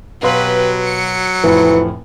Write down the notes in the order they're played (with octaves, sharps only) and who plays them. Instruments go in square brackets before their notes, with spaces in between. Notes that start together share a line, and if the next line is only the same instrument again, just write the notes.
[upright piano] B2 F5 C6 [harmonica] F#3 [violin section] G4 B4
[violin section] C#7
[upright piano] F1 A2 F3 [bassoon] E3